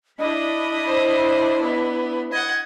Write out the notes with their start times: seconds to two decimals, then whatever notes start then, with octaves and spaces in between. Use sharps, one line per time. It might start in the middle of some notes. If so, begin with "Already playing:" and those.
0.19 D4 E4 D#5 B5
0.86 C5
1.61 B3
2.32 D#5 F#5 G#6